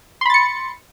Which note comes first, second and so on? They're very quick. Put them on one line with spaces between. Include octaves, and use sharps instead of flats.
C6 B5 A6 C#7